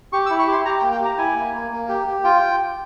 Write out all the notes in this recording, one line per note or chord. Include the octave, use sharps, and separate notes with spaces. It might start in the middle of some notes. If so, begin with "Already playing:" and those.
G4 C#6
E6
E4
C#6
G4 C6
G4 A#5
G5
A#3
G5
G4 A#5
E4 G#5
A#3
A#3
A#3
G4
G4
F4 G5